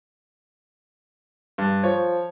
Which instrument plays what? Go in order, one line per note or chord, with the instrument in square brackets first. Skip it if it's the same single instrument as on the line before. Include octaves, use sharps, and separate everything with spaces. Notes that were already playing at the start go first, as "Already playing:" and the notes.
[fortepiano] G2
[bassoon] F3 [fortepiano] C#5